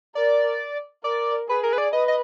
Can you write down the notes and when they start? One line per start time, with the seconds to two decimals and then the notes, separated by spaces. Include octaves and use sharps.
0.15 A#4 D5
1.04 A#4 D5
1.48 G#4 B4
1.63 A#4
1.73 B4
1.78 D5
1.92 B4 D#5
2.08 D#5